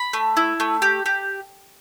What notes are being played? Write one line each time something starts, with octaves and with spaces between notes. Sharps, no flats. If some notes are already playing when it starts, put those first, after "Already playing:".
Already playing: B5
A3
E4
A3
G4
G4